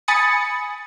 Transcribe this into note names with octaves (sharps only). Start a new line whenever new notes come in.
G#5 B5 D#6 A6 C#7